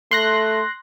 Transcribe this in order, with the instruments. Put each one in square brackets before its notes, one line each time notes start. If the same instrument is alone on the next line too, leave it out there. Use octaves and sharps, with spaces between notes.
[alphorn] A3 [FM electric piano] C6 F#6 A#6